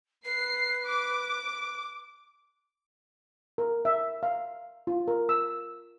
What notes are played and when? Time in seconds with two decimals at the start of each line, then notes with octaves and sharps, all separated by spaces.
0.25 B4 C7
0.86 D6
3.58 A#4
3.85 E5
4.23 F5
4.87 F4
5.08 A#4
5.29 E6